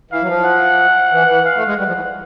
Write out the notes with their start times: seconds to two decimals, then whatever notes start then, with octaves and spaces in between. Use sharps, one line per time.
0.11 E3 F5
0.22 F#3
0.28 F3
0.44 F#5
1.12 E3
1.28 E3
1.45 F5
1.56 A3
1.67 G#3
1.78 G3 F#5
1.87 F3
1.95 E3